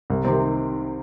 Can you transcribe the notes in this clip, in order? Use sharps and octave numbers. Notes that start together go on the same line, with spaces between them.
C2
C3 D#3 C4